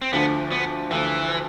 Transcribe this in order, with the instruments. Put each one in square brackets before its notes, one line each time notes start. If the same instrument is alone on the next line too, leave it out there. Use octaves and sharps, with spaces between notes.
[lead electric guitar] C4
[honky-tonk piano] D2 D3 F3 [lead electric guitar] B3
[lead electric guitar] B3
[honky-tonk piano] D2 D3 F3 [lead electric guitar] E3